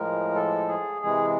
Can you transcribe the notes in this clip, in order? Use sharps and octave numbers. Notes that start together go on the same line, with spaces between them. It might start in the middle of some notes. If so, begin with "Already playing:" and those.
Already playing: A2 F3 G#3 A#4
A4
G#4
C3 E3 G#3 G#4